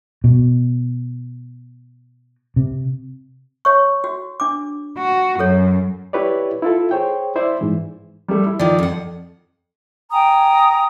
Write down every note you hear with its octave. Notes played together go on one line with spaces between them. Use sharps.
B2
C3
C#5 C#6
F#4
D4 D6
F#4
F#2 A4 C#5
E4 G4 B4 C#5 D5
E4 F4 A4
G#4 C5 C#5 G5
E4 C5 D5 E5
G#2 E3
G3 A3
E4
D#3 F3 D5
F2 F#5
G5 G#5 A#5 D#6